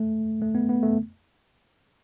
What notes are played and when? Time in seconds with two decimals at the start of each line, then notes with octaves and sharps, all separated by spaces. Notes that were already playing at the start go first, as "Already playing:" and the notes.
Already playing: A3
0.41 A3
0.55 B3
0.69 B3
0.83 A3